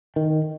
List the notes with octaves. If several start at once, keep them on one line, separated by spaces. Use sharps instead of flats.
D#3